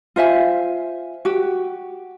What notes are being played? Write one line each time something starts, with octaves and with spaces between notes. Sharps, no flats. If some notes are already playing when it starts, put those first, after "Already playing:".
F4 C5 E5 G#5
F#4 G4